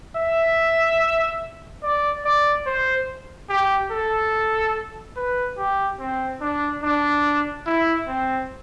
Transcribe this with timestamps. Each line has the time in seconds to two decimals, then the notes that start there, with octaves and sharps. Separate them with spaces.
0.16 E5
1.83 D5
2.25 D5
2.66 C5
3.50 G4
3.91 A4
5.16 B4
5.57 G4
5.99 C4
6.41 D4
6.83 D4
7.66 E4
8.08 C4